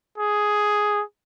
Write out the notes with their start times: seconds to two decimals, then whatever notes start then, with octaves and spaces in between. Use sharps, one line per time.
0.18 G#4